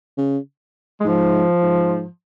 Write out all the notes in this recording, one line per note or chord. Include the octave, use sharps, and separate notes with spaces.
C#3
G#3
G#2 F3
G#2